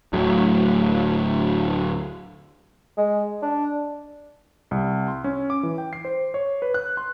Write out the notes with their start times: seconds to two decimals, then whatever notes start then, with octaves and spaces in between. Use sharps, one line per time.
0.13 D1 D2 F#3 A3
2.98 G#3
3.42 D4
4.71 C2
5.08 C6
5.24 C#4
5.50 D6
5.63 E3
5.78 G5
5.93 C7
6.05 C5
6.34 C#5
6.62 B4
6.74 F#6
6.97 C6